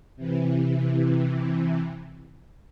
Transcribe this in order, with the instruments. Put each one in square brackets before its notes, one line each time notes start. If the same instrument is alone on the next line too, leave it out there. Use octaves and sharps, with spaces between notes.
[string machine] C3 E3